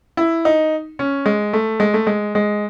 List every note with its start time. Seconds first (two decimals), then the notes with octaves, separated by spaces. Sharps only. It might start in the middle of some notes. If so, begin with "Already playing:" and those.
0.17 E4
0.45 D#4
0.99 C#4
1.26 G#3
1.53 A3
1.80 G#3
1.94 A3
2.07 G#3
2.35 G#3